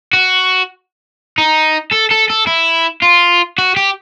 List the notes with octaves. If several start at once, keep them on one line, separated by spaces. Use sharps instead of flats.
F#4
D#4
A4
A4
A4
E4
F4
F#4
G4